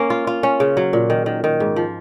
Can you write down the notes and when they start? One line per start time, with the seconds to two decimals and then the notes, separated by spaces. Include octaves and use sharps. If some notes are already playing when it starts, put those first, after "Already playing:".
Already playing: A#3 C#4
0.10 F4
0.27 F4
0.43 C#4
0.60 C#3
0.77 F#3
0.93 A#2
1.10 D#3
1.26 D#3
1.44 D#3
1.60 G#2
1.76 F3